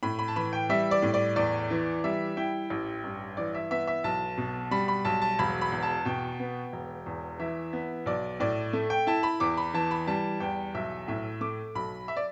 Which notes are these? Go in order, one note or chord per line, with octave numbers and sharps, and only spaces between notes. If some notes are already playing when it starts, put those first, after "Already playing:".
A2 B5
B5
A5
E3 B5
G5
G3 E5
D5
A2
D5
E2 D5
E3
G3 E5
E4 G5
A1
G2
E3 D5
E5
B3 E5
E5
B1 A5
B2
G3 B5
B5
B1 A5
A5
E1 B5
B5
E2
A5
B2 G5
B3
E1
E2
E3 E5
B3
B1 D5
A2 D5
A3
G5
E4 A5
B5
E2 D6
B5
E3 A5
B5
G3 A5
E2 G5
B1 E5
A2 E5
A3 D6
B1 B5
E5
D5